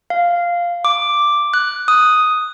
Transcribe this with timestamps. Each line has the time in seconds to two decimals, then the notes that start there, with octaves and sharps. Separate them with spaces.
0.10 F5
0.85 D6
1.54 F#6
1.88 D#6